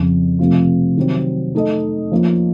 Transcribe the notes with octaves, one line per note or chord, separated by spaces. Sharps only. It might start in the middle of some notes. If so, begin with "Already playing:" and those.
Already playing: F2 C#3 F3
C3 F3 A3 C4 F4
C3 D#3 F#3 C4
A3 D#4 A4 D#5
F3 A#3 C#4 F4